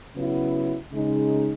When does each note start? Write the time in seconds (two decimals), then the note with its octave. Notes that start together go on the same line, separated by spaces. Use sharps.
0.14 C#3 F#3 B3 E4
0.92 C#3 G#3 D#4